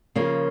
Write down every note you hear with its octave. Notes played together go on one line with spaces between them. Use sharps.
C#3 F3 A#3